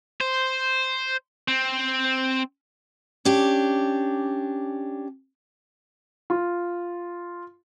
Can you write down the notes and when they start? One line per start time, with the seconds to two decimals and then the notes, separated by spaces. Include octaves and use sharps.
0.21 C5
1.48 C4
3.25 C#4 D4 G4
6.30 F4